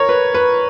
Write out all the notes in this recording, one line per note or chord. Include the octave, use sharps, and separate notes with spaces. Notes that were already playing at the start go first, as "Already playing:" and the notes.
Already playing: A#4 C#5
B4
B4